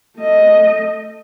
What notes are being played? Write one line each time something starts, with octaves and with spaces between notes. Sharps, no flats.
A3 D#5